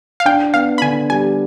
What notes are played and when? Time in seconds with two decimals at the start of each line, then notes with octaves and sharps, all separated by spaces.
0.20 F5
0.25 D4 G5
0.54 B3 F5
0.78 B5
0.82 D3 G#5
1.10 G3 G#5